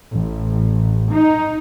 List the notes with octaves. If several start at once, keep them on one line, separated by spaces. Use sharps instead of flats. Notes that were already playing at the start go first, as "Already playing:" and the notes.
A1
D#4